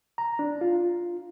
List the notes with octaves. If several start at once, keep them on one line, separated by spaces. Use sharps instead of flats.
A#5
D4
F4